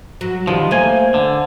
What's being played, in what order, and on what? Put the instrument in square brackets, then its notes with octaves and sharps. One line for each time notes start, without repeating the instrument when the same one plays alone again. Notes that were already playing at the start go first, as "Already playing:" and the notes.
[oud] F#3
[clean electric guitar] D#3 F3 [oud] G3
[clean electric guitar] A3 A#3 G#5 [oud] C5
[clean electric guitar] D3